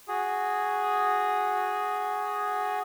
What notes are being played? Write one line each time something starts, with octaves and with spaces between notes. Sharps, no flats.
F#4 G#4